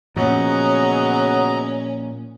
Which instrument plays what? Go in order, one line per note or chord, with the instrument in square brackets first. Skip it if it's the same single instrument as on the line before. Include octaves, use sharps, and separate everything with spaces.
[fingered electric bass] A#2 F3 [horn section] C#3 F#3 B3 [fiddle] C#4 [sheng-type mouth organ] D#5 A#5